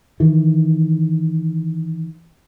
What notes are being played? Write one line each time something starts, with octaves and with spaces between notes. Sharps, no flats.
D#3 E3